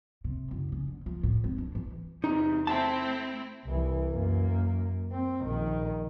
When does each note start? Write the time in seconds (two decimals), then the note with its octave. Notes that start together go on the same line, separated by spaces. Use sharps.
0.24 C3
0.51 F#1
0.72 C#3
0.88 D3
1.06 F3
1.23 A2
1.44 G#1
1.58 D4
1.75 E3
2.24 E2 C3 D#4
2.67 A3 C4 E4 A5
3.65 C2 E3
4.11 F#2 A#3
5.12 C4
5.42 A#1 D#3